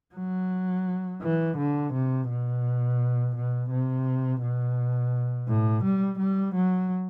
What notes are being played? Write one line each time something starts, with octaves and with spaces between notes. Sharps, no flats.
F#3
E3
D3
C3
B2
B2
C3
B2
A2
G3
G3
F#3